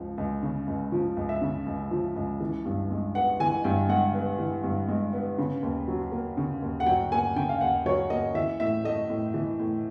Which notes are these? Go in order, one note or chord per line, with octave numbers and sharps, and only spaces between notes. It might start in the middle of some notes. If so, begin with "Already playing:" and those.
Already playing: C#2 F3
C#2
C#3
C#2
F3
C#2
E5
C#3
C#2
F3
C#2
E3
G2
G#3
B3 F#5
E3 G#5
G2 G5
G#3 F#5
B3
E3
G2
G#3
B3
C#3
D#2
F#3
A#3
C#3
D#2
F#5
F#3 G5
A#3 G#5
C#3 G5
F5
D#2 F#5
F#3 C#5
A#3 D#5
E3 E5
A2 E5
A3 D#5
A2
E3
A2